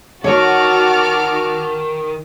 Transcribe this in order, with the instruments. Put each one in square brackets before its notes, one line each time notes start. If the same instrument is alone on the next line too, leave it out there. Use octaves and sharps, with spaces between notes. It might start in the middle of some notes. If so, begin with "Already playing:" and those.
[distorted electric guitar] D#3 [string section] F#4 [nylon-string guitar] C#5 [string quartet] A5 D6 F6